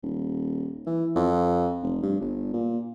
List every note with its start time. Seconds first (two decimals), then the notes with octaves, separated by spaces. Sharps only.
0.03 D#1
0.86 E3
1.15 F2
1.83 F1
2.02 G2
2.20 G1
2.53 A#2